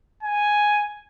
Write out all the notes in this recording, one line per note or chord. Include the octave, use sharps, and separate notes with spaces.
G#5